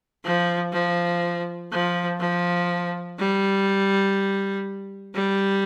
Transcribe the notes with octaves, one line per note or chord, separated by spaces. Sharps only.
F3
F3
F3
F3
G3
G3